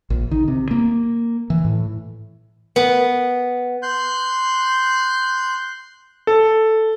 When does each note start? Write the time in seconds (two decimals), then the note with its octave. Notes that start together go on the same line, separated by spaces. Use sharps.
0.10 A#1
0.31 D#3
0.48 C3
0.71 A#3
1.50 E3
1.65 A2
2.76 B3
3.83 C6 F#6 G6
6.27 A4